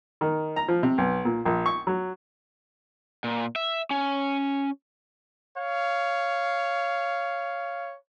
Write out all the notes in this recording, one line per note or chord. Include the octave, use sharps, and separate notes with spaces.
D#3
A#5
F3
C3
B1
A#2
A#1
C#6
F#3
A#2
E5
C#4
C#5 F5